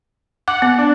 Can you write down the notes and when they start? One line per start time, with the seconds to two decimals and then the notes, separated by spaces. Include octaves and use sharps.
0.48 F#5 D6
0.62 B3
0.78 D4